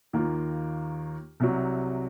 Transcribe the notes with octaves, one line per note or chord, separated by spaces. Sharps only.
D#2 D#3 A#3 F4
C2 C3 F#3